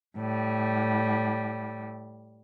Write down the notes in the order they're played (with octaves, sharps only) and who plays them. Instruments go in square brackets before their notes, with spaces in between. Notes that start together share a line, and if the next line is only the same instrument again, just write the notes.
[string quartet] A2 G3